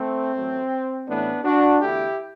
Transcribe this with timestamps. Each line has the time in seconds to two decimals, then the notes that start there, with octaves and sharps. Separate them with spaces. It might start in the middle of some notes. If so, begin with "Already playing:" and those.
Already playing: A3 C4
0.36 A1 A2 F#3 A3
1.08 A1 A2 E3 A3 B3 D4
1.45 D4 F#4
1.81 E2 D3 A3 E4 G4